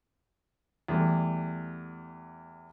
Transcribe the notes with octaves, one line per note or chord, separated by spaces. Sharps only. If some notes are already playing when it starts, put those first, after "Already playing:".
E2 G3 A3